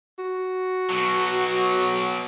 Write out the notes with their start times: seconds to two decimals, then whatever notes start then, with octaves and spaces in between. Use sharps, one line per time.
0.19 F#4
0.90 B2 F#3